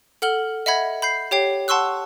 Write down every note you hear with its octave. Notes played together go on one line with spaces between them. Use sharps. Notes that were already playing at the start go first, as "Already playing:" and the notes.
A4 F#5 F6 F#7 G7
D#5 E5 F#5 B5 G#6
B5 G6 C7
G4 C#5 G5 C7
F#5 A5 C6 C#6 E6 F#6